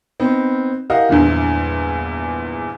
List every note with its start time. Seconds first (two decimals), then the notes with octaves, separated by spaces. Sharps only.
0.20 B3 C4 D#4
0.90 E4 G4 A#4 D#5 F5 F#5
1.09 A#1 E2 G2 A#2 D3